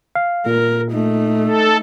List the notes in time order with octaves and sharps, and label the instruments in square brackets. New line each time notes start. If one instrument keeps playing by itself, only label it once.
[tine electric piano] F5
[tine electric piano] A#2 [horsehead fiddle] A#4
[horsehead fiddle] A3 D#4
[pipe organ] A4